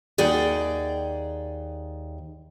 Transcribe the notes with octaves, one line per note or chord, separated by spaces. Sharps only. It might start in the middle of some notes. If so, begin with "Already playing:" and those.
D#2 G#4 D5 F#5 G5